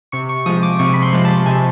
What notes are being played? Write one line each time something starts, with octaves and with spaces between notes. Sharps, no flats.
C3 C#6
C#6
F3 G#3 D#6
D6
C3 C#6
B5
C6
F3 G#3
A5
C3 G#5